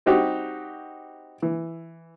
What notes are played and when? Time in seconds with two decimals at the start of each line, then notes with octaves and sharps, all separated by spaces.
0.06 G3 C4 D#4 F#4 G4
1.42 E3